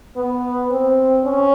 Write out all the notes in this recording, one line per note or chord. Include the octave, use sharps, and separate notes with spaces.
B3
C4
C#4